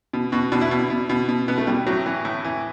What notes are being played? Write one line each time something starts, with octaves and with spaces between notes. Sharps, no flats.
B2
B2 F#4
B2 D4
E4
B2
B2
B2
B2
B2 B3
A3
B2 G3
A2 F#3
E3
A2
E3